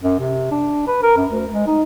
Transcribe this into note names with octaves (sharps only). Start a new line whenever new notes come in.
F#2
C3
D4
B4
A#4
F#2
D2
G#3
D#4